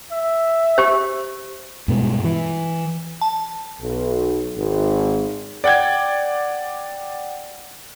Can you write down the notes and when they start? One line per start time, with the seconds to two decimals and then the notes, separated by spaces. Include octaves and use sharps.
0.12 E5
0.78 G4 C5
1.88 G2 B2 G#3
2.25 E3
3.21 A5
3.80 B1
4.57 G#1
5.64 D5 F#5 G5 G#6